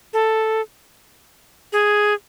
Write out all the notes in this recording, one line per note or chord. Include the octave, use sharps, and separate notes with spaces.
A4
G#4